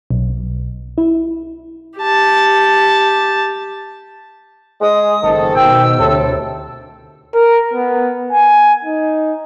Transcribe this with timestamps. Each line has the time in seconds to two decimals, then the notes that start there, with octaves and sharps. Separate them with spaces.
0.10 B1
0.98 E4
1.99 G4 A5
4.81 G#3 D#6
5.23 F#1 G#2 D#3 A4
5.55 B2 G5 E6
6.00 D2 A2 C3 A4
7.34 A#4
7.74 B3
8.32 G#5
8.85 D#4